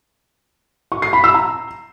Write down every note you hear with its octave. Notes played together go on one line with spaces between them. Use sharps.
C#6
C7
B5
E6
A#5